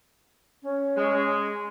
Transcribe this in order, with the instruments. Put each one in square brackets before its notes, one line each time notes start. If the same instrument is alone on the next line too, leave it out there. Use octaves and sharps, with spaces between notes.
[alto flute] C#4
[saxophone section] G#3